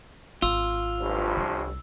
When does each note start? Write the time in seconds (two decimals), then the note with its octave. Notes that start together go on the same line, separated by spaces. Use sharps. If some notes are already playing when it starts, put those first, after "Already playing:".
0.42 G#1 F4 E6
0.99 A1 G2 F3
1.37 C2